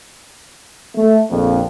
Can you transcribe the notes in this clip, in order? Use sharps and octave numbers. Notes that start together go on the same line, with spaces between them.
A3
A#1 F2